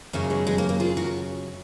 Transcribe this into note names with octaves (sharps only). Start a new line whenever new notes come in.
F#2 C#3 F#3 A#3 C#4
G#3 B3
G#3 B3
A#3
A#3
F4 G#4
F#4 A#4